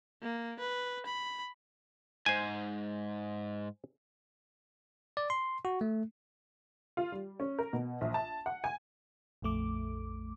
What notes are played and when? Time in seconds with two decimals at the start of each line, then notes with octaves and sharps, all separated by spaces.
0.22 A#3
0.60 B4
1.06 B5
2.26 G#2 C5 G#5
5.17 D5
5.30 C6
5.65 F#4
5.81 A3
6.97 F4
7.12 G3
7.40 C#4
7.59 A#4
7.73 B2
8.01 A#1
8.14 A5
8.46 F#5
8.64 G#5
9.42 A#1 F2 A3 D6